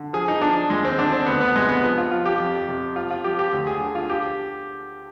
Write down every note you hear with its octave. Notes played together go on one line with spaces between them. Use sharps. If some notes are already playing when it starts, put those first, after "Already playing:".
Already playing: D3
F3 G#4
D#4
F3 D4
D#2 G#3
C4
D3 D4
C4
D2 B3
B3
C3 G#3
B3
F3
F4
F3 F4
G4
F2
C3
F3 F4
F4
F3 G4
G4
D2
G#4
D3
F4
G4